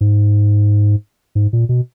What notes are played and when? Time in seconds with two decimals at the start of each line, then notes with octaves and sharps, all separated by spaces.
0.01 G#2
1.35 G#2
1.53 A#2
1.69 B2